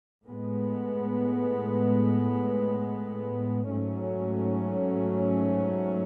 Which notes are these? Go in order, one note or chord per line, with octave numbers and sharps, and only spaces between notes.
A2 G#3 B3
G#2 F#3 A3 C#4